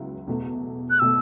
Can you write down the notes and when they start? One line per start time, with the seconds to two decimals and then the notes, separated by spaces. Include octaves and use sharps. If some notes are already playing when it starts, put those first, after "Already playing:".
Already playing: C#2 C#3 F#3 B3 E4
0.27 E2 B2 A3
0.90 F#6
1.00 B2 A3 E6